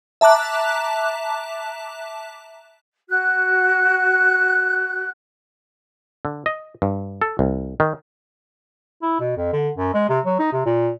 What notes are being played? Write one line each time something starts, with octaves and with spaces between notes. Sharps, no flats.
E5 A5 A#5 D6 F#6
F#4 F#6
D3
D#5
G2
A4
C2
D#3
E4
B2
F2
D3
F#2
G#3
C3
F#3
D#4
C3
A#2